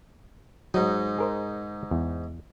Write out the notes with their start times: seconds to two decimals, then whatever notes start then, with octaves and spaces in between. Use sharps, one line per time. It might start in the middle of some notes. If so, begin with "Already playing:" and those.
0.74 G#2 F#3 D#4
1.18 G#4 A#4 C5
1.91 E2